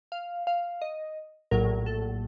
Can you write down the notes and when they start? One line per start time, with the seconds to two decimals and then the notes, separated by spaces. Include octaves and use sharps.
0.12 F5
0.47 F5
0.82 D#5
1.51 A#1 A2 F#3 A#4
1.86 A4